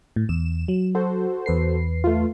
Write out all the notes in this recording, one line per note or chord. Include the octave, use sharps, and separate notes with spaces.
A2
E2 E7
F#3
F#4 A4 C5
E2 B4 C7
A3 F4